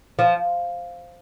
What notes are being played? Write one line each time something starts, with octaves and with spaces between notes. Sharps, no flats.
F3